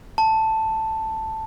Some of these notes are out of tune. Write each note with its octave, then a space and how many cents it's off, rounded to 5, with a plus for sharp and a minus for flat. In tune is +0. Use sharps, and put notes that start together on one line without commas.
A5 +5